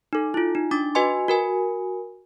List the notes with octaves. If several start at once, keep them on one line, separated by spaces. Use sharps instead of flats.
D#4 A4
E4 F4
D#4
D4 D6 A6
F#4 B4 D#5 G#5 C6
F#4 A#4 G#5